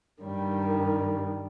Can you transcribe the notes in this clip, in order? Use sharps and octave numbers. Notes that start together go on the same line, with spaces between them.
G2 D#3 G3